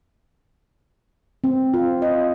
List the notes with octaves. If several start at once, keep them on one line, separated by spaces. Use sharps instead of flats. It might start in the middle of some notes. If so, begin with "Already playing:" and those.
C4
F4
D#5